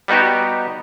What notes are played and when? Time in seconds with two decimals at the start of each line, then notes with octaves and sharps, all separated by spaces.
0.08 G3 B3 D#4 F#4 G4